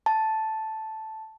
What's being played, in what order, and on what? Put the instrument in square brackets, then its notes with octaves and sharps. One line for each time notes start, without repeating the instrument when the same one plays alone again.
[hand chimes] A5